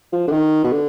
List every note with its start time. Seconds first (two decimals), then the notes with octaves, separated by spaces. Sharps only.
0.13 F3
0.28 D3
0.32 D#3
0.64 B2
0.72 D3